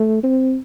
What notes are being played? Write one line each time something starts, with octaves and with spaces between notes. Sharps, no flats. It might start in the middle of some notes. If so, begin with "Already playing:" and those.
Already playing: A3
C4